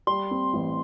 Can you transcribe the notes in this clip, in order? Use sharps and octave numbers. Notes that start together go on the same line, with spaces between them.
G3 C6
C4
A1